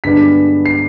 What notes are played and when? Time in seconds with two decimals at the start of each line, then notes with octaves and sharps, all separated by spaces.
0.04 G2 D3 G#3 B3 D4 B6
0.66 C7